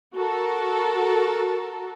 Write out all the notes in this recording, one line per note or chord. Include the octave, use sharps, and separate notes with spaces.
F#4 A4 A#4